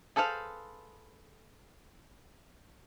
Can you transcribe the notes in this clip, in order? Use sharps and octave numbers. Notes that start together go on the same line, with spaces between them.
G#4 A4 B4 C5 F5